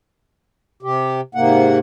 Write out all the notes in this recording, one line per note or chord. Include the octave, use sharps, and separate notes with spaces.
C3 G4
G#2 C3 A#3 F#5